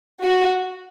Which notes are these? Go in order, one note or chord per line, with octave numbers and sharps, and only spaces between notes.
F#4